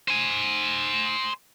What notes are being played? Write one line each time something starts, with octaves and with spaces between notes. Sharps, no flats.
C5 G#5